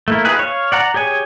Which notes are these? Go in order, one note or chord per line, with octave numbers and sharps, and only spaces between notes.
A3 A#3 E4
D#4 F4 G4 G#4 B4
C#5 F5
D5 F#5 A#5
G4 G#4 C#5 G#5